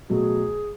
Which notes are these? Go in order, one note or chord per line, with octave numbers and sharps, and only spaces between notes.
B2 F#3 A3 G#4